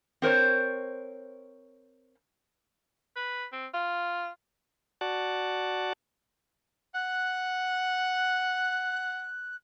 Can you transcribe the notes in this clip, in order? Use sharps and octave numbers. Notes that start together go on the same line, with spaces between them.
C4 A#4 C5 C#5
B4
C4
F4
F#4 D5 F#5 A5
F#5 F#6